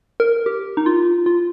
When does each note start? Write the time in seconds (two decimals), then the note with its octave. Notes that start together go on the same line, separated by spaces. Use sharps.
0.20 A#4
0.46 G4
0.77 D#4
0.86 F4
1.26 F4